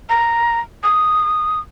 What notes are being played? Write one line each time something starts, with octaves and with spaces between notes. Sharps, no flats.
A#5
D#6